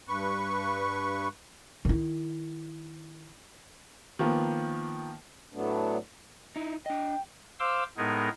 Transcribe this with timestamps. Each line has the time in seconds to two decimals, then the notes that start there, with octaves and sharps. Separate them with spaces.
0.08 G2 B4 C#6
1.85 D#3 E4
4.19 D#3 F3 A#3 B3
5.53 A2 F#3 A3 B3 D4
6.56 D#4 E4
6.86 D4 D#5 G5
7.60 C5 F5 C6 D6 E6
7.97 A2 G#3 B3 D#4 G#4 A#4